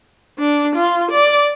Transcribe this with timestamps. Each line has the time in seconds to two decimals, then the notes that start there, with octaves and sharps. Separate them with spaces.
0.39 D4
0.75 F4
1.11 D5